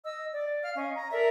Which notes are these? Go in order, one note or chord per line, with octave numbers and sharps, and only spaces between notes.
D#5 E6
D5
F5 F6
C#4 D#5 F5
A#5
A4 A#4 D5 E5